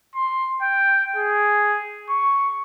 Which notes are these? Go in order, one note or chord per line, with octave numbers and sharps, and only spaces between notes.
C6
G5
G#4
C#6